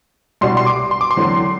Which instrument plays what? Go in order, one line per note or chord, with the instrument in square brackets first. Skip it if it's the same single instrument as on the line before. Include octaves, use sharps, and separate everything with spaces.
[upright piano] C2 B2 G3 D4 F#4 [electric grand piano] C6
[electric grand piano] C6
D6
C6
D6
C6
[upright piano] E2 D3 F#3 C4